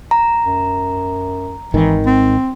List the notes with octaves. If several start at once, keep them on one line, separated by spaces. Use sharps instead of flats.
A#5
F#2
G#1 D#3 E3
C4